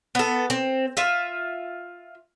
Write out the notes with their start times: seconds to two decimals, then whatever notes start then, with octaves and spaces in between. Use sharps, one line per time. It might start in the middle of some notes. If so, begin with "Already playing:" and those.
0.15 B3 A4
0.50 C4
0.97 F4 E5